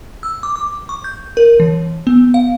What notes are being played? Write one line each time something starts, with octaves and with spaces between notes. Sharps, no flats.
E6
D6
D6
C#6
G6
A#4
E3
B3
F5